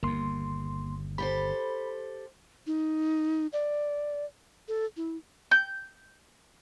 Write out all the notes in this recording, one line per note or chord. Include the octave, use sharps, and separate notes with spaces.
G1 D#2 A#3 C6
G4 A4 C5 B5
D#4
D5
A4
E4
G6